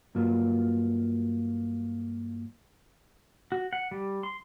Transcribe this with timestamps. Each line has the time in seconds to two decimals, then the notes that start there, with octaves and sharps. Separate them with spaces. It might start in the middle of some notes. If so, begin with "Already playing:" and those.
0.15 G2 F#3 A#3 F4
3.52 F#4
3.73 F#5
3.91 G3
4.23 C6